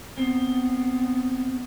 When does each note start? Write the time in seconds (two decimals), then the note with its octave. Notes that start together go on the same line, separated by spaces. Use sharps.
0.18 B3 C4